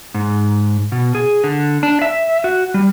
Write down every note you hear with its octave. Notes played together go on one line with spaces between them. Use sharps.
G#2
B2
G#4
D3
D4
E5
F#4
G3